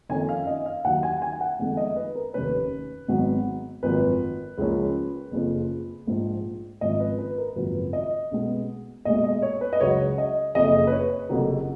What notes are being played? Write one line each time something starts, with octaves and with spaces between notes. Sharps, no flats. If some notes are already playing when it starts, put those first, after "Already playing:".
F2 D#3 A#3 C#4 G#5
F5
D#5
F5
D#2 D#3 F#3 F#5
G#5
G#5
F#5
F2 D#3 G#3 B3
D#5
B4
A#4
F1 D#2 D#3 A#3 C#4 B4
G#1 G#2 F#3 B3
G#1 F#2 F3 A#3 B4
C#2 C#3 F3 A#3 C#4
F#1 F2 C#3 F3
A#1 G#2 F3
G#1 G#2 F3 A#3 C#4 D#5
B4
B4
A#4
G#1 F#2 C#3 F3 A#3 B4
D#5
B1 B2 G#3 B3
B1 A#2 G#3 D#5
D#5
C#5
B4
D#5
C#2 C#3 F#3 C#4 C#5
D#5
F#1 F2 C#3 D#5
B4
C#5
F1 F2 C#3 F#3 A#3